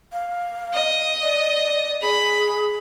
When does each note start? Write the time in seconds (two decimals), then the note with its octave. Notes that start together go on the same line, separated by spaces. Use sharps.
0.13 F5
0.73 D#5
1.22 D5
2.02 G#4 B5